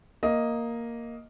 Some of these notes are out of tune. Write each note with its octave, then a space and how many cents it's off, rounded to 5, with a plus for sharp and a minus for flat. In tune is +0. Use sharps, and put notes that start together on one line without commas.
A#3 +0 D#5 +5